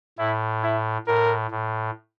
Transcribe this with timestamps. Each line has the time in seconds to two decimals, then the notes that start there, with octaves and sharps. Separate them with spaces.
0.18 A2 E4
0.64 E4
1.07 A2 A#4
1.51 A2